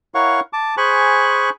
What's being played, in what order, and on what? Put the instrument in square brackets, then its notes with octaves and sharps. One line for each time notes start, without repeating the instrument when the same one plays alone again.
[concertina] E4 A#4 C#5 F5 F#5 C#6
A5 D6
G#4 C5 G#5 B5 C#6 F#6